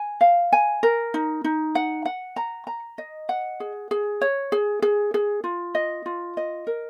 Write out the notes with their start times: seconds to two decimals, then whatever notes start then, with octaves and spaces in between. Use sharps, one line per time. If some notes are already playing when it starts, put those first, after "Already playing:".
Already playing: G#5
0.21 F5
0.53 G#5
0.83 A#4
1.14 D#4
1.44 D#4
1.75 F#5
2.05 F#5
2.36 A#5
2.67 A#5
2.98 D#5
3.29 F#5
3.60 G#4
3.91 G#4
4.21 C#5
4.52 G#4
4.82 G#4
5.14 G#4
5.44 F4
5.75 D#5
6.06 F4
6.37 D#5
6.67 A#4